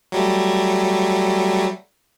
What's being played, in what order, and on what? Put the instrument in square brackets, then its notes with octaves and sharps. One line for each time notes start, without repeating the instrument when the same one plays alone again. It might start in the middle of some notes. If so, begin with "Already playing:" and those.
[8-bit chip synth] F#3 G3 A3